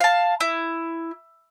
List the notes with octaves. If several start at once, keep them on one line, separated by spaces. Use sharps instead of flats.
F5 A5
E4